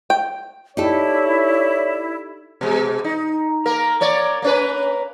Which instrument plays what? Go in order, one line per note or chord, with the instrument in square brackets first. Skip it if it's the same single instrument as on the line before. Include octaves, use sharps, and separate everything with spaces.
[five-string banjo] G5
[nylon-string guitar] D#4 G4 A4 [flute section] E4 [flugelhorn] C#5 [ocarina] D5
[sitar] B2 G#3
D#4
A#3 A#4
A#3 C#5 D5
A#3 C#4 B4